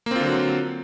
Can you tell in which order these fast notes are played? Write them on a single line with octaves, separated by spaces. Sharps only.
A#3 C4 F4 D3 F#3